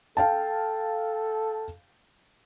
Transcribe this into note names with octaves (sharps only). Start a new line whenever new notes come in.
A4 F5 G5 A5